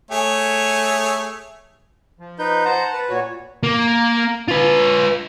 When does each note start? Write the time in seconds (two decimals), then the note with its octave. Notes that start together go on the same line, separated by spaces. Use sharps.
0.11 A3 G#4 C#5
2.19 F3
2.39 D#4 B4 G6
2.65 C5 F#5 A5 A#5
2.93 B4
3.09 A#2 F#4 C#5
3.63 A#3
4.48 F4 B4